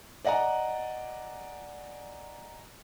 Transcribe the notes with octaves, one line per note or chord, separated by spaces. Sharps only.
D5 D#5 F#5 G#5 A#5